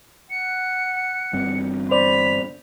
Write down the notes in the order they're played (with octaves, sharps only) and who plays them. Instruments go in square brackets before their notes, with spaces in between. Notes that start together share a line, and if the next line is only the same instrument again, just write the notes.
[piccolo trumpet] F#5 [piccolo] C#7
[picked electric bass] G1 G2 C4
[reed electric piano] C5 D5 [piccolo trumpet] B5 [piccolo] F7